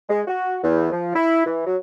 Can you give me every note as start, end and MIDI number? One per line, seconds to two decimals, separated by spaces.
0.09 0.21 56
0.27 0.57 66
0.62 0.90 40
0.91 1.12 53
1.15 1.45 64
1.46 1.64 52
1.65 1.77 54